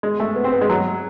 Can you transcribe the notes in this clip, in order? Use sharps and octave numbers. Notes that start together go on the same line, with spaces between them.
G#3
A3
B3
C4
B3
G#3
F#3